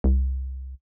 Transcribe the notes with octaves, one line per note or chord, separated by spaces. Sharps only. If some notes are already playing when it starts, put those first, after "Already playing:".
C2